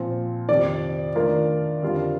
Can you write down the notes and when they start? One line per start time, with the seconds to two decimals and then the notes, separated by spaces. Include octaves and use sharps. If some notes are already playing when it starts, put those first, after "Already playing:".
Already playing: A#2 F3 C4
0.49 F2 C3 D#3 D5
1.15 D#3 A3 D4 F4 A#4
1.83 F2 D3 G3 D4 F4